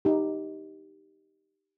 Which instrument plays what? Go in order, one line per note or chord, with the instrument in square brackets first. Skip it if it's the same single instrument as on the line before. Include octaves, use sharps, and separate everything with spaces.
[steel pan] D#4 G4